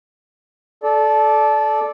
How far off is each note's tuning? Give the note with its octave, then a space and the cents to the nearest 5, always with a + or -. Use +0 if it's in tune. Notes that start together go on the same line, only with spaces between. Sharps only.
A4 -20 D5 +0